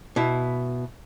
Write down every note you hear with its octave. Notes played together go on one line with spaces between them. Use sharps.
B2 E4